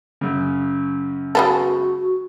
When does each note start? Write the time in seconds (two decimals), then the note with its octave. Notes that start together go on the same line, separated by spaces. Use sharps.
0.21 F#2 C#3
1.35 G#3 B3 F#4 A4